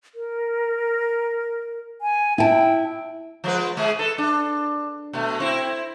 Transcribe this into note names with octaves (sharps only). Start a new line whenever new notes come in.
A#4
G#5
E4 G5 A5
F3 G#3 B4
G#3 G#4
A4 B4
D4
B2 A3
C4 E4